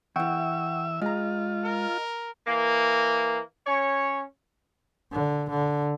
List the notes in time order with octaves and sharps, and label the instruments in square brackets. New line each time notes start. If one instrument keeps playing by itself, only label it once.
[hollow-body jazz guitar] E2 E3 [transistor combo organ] E5 [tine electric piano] F#5 G5 C#6
[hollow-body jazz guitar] G#3 A#5 [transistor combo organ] F4 [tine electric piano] D#5
[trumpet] A#4
[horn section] E3 A#3
C#4 C#5
[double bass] D3
D3